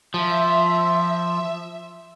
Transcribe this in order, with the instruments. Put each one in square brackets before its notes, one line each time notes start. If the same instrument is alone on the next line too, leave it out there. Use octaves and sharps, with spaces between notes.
[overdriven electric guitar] F3 [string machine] E5